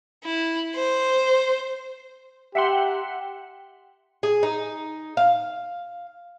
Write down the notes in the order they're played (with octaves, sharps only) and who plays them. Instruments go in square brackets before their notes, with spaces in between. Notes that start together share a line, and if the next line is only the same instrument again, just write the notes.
[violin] E4
C5
[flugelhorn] G4 [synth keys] E5 F#5 C6 [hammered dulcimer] G5 A#5
[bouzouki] G#4
D#4
F5